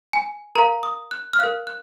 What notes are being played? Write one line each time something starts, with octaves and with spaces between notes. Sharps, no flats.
G#5
A#4 F5 A#5
D#6
F#6
F6
A#4 F5 F#6
F#6